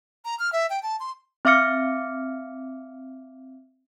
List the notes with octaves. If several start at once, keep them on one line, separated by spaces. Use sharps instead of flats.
A#5
F6
E5
G5
A5
C6
C4 E5 F5 D6 F6 C#7